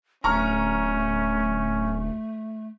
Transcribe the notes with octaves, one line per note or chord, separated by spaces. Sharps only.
D1 A3 C#4 A#5 C#6 F6